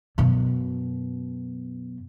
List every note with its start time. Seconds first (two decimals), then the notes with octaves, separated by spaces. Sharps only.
0.18 F#2 B2